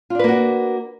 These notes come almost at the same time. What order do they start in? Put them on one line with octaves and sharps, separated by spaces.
F4 D4 B4 A#3 F#4